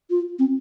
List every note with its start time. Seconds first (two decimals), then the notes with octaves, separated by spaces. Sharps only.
0.10 F4
0.39 C4